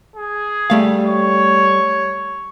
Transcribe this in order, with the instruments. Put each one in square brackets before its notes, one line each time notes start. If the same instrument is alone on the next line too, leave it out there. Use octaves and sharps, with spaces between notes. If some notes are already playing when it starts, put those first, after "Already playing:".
[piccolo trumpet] G#4
[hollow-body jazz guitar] G3 A3 F5
[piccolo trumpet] C#5